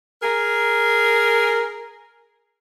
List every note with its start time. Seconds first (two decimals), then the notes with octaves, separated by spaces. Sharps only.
0.22 G#4 A#4